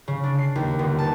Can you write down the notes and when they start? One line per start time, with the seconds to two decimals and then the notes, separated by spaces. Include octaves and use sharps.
0.08 C#3
0.23 D4
0.39 C7
0.55 D#2
0.79 G1
0.99 A5